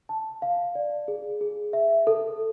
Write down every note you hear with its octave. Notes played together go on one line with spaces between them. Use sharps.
A5
F5
D5
G#4
G#4
E5
A4